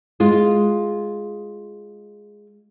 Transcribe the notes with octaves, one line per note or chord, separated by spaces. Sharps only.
G#3 F4